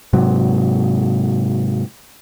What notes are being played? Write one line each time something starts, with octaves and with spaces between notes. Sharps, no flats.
G#2 C3 F#3